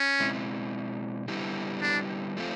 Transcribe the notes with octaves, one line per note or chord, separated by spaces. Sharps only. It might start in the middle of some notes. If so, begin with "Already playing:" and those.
Already playing: C#4
B2 G#3 C4 E4
D3 G3 B3 E4 G4
D4
F3 A3 C4 F4